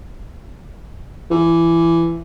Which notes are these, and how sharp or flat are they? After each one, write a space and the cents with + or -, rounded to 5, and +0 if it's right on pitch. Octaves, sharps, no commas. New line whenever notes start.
E3 +20